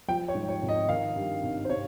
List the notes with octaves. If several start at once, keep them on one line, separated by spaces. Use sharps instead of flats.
F3 G5
C#5
G#2
C#5
G#1
D#5
D#3 F5
G2
G#1
C5
C3 C#5